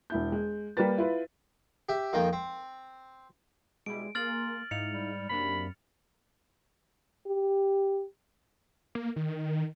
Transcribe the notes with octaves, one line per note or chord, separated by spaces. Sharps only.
E1 E4 G6
G#3
G3 A#3 G4 A#4 B4 A6
E4 F4 B4
G4 E5
F2 D#3 A#3 G5
C4
B2 G3 G#3 E4 D7
A#3 G#4 A#4 C6 F6 A6 F#7
G#2 D#4 E4 F5 C#7 F7
G3
F#2 C3 A#3 D4 B5
G4
A#3
D#3